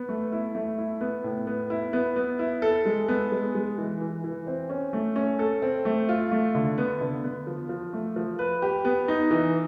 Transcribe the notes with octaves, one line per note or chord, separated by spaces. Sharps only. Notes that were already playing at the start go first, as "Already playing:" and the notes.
Already playing: B3
A3
E4
A3
E4
B3
A2
B3
E4
B3
B3
E4
A4
G#3
B3
G#3
G#3
E3
E3
E3
C4
C#4
A3
C#4
A4
C4
A3
F4
A3
D3
B3
D3
B3
F3
F3
A3
F3
B4
G4
B3
D#4
E3